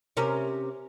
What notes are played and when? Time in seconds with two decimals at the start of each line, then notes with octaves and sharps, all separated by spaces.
0.17 C3 C#4 A#4